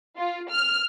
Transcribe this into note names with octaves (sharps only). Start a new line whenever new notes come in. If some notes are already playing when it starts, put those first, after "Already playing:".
F4
F6